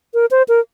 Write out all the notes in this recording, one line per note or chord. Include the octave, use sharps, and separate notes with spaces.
A#4
C5
A#4